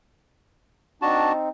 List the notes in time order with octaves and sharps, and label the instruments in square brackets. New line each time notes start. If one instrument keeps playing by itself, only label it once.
[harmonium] C4 D#4 [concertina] D4 [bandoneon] F#4 A5